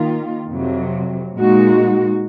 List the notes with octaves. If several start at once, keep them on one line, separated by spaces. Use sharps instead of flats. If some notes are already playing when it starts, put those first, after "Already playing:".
Already playing: D#3 A#3 F4
F2 C3 F#3
A#2 G#3 D#4 F#4